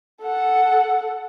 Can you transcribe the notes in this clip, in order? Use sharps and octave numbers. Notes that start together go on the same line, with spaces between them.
A4 F#5